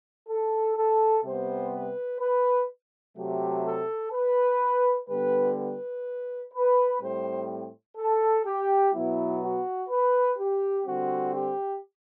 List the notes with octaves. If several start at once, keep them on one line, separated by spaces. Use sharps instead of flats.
A4
A4
C3 G3 B3 C5
B4
B4
C3 F#3 A3 G4
A4
B4
D3 G3 B3 B4
B4
B4
A2 G3 C4 C5
A4
G4
B2 F#3 B3 E4
F#4
B4
G4
D3 G3 C4 F#4
G4